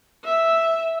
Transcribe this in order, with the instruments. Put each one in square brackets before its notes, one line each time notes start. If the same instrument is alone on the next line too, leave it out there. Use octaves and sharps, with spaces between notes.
[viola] E5